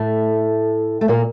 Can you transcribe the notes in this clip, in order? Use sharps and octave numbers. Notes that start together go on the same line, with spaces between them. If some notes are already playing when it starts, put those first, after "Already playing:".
Already playing: A2 A3
A3
A#2 A#3